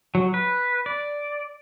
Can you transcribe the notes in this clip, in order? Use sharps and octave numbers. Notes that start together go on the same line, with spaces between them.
F#3
B4
D5